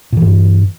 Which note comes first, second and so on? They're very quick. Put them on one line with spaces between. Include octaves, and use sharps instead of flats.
A#2 E3 G2